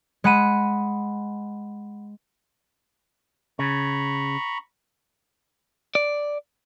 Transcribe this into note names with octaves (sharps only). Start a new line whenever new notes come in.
G#3 F#5 B5 D#7
C#3 A#5 B5 C#6
D5